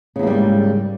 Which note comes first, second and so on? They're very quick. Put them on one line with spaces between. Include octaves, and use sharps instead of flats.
C#3 E2 A#3 G3 G#2